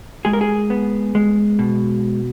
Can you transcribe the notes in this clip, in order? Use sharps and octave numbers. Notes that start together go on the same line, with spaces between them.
G#3 G#4
A#4
G#4
B3
G#3
B2